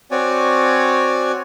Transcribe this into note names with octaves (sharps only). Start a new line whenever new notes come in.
C4 F#4 C#5 D5 G#5